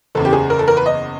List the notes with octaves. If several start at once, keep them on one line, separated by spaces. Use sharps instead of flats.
F#1 E2 C#3 A4
G4
G#4
A#4
A4
A#4
B4
D#5